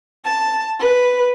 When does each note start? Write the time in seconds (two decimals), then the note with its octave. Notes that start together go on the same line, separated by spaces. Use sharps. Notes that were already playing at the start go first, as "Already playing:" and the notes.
0.24 A5
0.79 B4